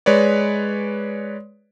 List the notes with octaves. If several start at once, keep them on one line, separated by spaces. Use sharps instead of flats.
G#3 B4 C#5 D5